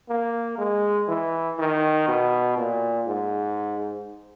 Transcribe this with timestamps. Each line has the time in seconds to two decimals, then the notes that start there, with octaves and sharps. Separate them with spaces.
0.09 A#3
0.58 G#3
1.08 E3
1.59 D#3
2.08 B2
2.57 A#2
3.07 G#2